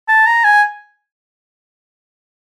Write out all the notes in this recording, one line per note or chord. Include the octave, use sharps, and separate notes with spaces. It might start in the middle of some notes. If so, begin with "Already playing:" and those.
A5
A#5
G#5